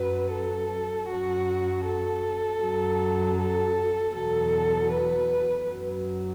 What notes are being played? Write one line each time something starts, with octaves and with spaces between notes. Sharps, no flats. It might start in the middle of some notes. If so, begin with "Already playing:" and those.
Already playing: F#2 F#3 B4
A4
F#2 F#3 F#4
A4
F#2 F#3
A4
E2 B2 F#3 A4
B4
F#2 F#3